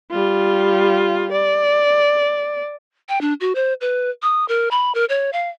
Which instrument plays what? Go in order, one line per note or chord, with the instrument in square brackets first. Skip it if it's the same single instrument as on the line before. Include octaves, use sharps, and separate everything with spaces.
[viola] G3 F4
D5
[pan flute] G5
D4
F#4
C5
B4
D#6
A#4
B5
A#4
C#5
F5